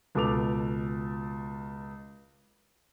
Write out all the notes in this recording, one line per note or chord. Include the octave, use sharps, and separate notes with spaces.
C#2 B2 A4 D6 F7